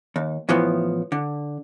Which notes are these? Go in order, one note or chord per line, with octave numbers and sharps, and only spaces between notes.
D#2
A2 E3 F3 B3
D3